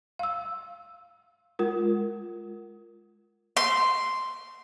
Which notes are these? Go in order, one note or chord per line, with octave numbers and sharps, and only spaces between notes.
F5 E6
G#3 F4 A#4
C6